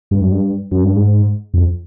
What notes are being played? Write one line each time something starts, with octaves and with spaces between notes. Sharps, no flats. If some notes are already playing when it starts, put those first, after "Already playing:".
G2
F#2
G2
F#2
G2
G#2
F2